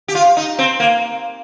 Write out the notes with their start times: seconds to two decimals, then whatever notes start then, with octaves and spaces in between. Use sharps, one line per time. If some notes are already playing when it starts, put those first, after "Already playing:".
0.08 G4
0.15 F4
0.37 D#4
0.59 C4
0.80 A#3